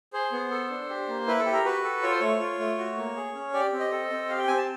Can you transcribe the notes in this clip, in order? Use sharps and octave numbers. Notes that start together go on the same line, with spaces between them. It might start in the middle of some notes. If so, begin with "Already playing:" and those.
G#4 C5
B3
A4
D4
G4
A#3
E4 B4
A4
G4
A#4
F#4 B4
A4
F4 C#5
C5
A3 C#5
F4
A3
F#4
A#3
G#4
C#4
G4 D5
C4
D#5
A4
C4
G4 F5
G5
C4 G#5
A5